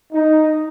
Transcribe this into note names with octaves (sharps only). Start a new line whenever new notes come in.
D#4